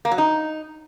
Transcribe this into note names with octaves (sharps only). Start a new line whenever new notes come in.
A#3
F#3
D#4